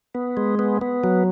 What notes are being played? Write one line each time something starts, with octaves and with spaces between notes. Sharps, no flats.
B3
G#3
B3
B3
F#3